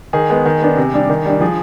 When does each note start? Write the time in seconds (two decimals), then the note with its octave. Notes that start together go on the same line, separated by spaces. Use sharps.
0.13 D#3 G#4
0.30 G#3 B3
0.46 D#3
0.62 B3 D4
0.77 C3
0.94 G3 D4
1.09 D#3
1.26 G3 D4
1.40 F3 G#4